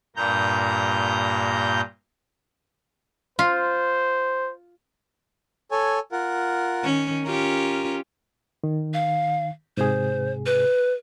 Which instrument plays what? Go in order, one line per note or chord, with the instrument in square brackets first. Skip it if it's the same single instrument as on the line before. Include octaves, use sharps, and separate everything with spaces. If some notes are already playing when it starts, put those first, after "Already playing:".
[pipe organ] G2 A#2 A#5 G6
[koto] F4 [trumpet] C5
[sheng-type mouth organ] A4 C#5 G#5
F4 A#4 F#5
[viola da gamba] D#3 C#4
[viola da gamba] C#4 F4 G4 [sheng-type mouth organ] A#4
[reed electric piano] D#3
[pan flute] F5
[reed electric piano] G#2 C3 G#4 [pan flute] C5
[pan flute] B4